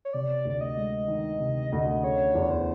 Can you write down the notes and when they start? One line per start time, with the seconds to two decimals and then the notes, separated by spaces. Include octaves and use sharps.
0.05 C#5
0.13 C3 D5
0.45 D2 D5
0.61 D#5
0.77 G#3
1.08 D#3
1.40 C3
1.72 D2
2.03 C#3 C#5
2.35 E2
2.42 C#5
2.50 C5